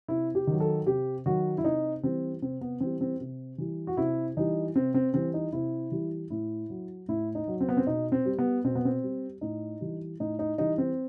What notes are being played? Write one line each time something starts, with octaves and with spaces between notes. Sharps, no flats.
C3 E4
G4
D#3 F#3
A4
C3 G4
D#3 F#3 F#4
E4
C3 D#4
E3 G3 C4
C3 C4
B3
E3 G3 C4
C4
C3
E3 G3
F#4
C3 E4
E3 G3 D#4
C3 C4
C4
E3 G3 C4
D#4
C3 E4
E3 G3
A2 E4
F#3
A2 E4
D#4
F#3
C4
B3
C4
B2 D#4
C4
G3
B3
B2 C4
B3
C4
G3
A2 D#4
E3 G3
A2 D#4
D#4
E3 G3 D#4
C4